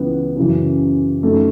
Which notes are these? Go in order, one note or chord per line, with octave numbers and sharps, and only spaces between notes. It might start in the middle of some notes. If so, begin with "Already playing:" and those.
Already playing: C#2 C#3 E3 B3
F#2 C#3 E3
F#2 D#3 A3